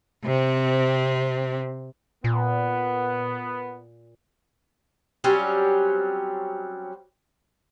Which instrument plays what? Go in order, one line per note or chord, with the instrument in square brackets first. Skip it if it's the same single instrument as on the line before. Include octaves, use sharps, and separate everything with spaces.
[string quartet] C3 C4
[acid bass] A#2 [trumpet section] B3
[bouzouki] F#3 G3 C4 C#4